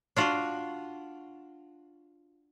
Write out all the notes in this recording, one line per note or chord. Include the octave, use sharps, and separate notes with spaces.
D4 F4 F#4